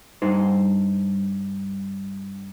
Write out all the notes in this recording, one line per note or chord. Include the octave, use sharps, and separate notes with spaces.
G2 D#4 C5